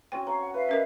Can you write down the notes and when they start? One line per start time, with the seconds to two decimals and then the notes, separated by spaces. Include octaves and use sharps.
0.12 C4 C#4 F#4 G5
0.27 C#5 F5 A#5
0.41 F#5
0.54 B4 E5 F5
0.69 C#4 A#4 D#5